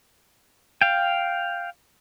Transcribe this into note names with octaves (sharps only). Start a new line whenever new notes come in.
F5 G5